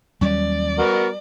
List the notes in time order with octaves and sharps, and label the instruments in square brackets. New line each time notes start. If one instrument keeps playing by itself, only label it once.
[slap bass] D#2 F#3 C#4 [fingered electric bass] G3 [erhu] D5
[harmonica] B3 F#4 A#4